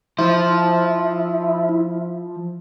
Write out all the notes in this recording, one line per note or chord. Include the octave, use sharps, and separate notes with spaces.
F3 E4 C5